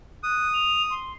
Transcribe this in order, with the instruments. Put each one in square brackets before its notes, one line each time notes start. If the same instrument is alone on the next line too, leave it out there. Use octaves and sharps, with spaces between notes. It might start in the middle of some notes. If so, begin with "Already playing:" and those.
[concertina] D#6 [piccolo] F#6
[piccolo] F7
C6